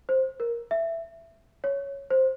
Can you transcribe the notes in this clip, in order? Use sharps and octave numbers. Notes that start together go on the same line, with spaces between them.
C5
A#4
E5
C#5
C5